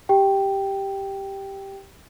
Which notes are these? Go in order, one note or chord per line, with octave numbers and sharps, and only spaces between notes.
G4 G5